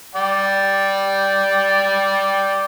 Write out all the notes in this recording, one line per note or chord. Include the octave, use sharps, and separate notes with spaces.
D5 G5